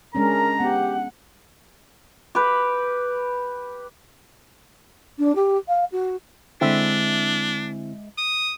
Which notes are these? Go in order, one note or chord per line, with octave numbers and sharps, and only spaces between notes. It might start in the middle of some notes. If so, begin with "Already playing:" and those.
G#3 C#4 D4 A#4 A#5
B3 G4 F#5
G4 B4
D4
G4
F5
F#4
D3 G#3 C4 D4 E4 E5
D#6